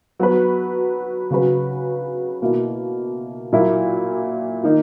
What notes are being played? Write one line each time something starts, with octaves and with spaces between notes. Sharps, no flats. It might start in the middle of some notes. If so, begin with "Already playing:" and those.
F#3 B3 F#4 B4
C#3 F#3 C#4 F#4 B4
B2 A#3 E4
A#2 F#3 A#3 E4
D#3 A#3 D#4